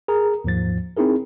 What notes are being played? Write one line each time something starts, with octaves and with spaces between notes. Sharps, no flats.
G#4 A#4 A#5
D#2 G#2 F3 A6
C4 D#4 E4 G#4 A#4